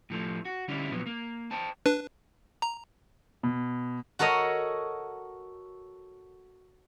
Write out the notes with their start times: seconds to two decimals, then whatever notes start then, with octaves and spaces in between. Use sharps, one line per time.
0.10 A2 F3 A3
0.45 F#4
0.68 D3 G3 C#4 D4 E4
0.91 A#2 F3 F#3 B3
1.06 A#3
1.51 C5 G5 A5
1.86 D4 B4
2.62 A#5
3.43 B2
4.19 F#4 A4 A#4 C#5 D#5